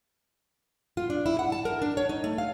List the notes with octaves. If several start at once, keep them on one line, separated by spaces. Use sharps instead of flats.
F4
D4
E4
F#5
A5
A#4
D4
C#5
D#4
A3
F5